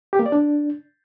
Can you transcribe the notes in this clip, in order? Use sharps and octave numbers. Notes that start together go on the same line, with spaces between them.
G4
A#3
D5
D4